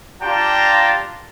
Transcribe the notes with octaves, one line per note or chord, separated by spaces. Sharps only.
D4 F4 G4 G5 A5 A#5